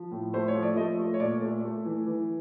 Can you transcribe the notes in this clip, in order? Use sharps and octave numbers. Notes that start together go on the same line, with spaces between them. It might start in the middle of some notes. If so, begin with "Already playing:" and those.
Already playing: F3
A2
A3 C5
C#5
F3
D5
A3 D#5
A3
C#5
A#2 D5
A3
A3
E3
E3